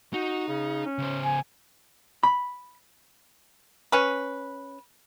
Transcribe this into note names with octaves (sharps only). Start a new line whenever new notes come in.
D#4 F#4
C#3
C#4
C#3 C5
G#5
B5
C#4 B4